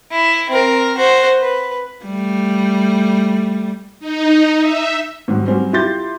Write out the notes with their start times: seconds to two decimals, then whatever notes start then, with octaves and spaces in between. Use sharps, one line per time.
0.11 E4
0.50 C4 A#4
0.97 F#4 C5
1.41 B4
2.05 G3 A3
4.00 D#4
4.61 E5
5.28 G#2 D#3 F#3 G3
5.46 F#3 G3 C4 C#4
5.73 E4 F4 G4 C6 G6 A6